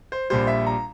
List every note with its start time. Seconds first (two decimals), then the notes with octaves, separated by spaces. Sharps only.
0.12 C5
0.30 A#1 A#2 G3 C5
0.47 E5
0.67 A#5